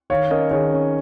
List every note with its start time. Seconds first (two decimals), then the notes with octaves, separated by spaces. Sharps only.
0.10 D#3 C#5 F5
0.30 C#4 A#4 D#5
0.51 D#3 G#4 C#5
0.73 C#4